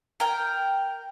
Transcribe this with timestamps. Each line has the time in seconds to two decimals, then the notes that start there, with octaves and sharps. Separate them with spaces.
0.20 A#4 G5